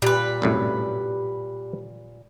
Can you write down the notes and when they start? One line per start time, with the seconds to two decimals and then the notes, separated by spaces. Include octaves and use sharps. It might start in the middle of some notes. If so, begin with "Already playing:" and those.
0.02 A#2 G3 B4
0.42 C2 F#2 A2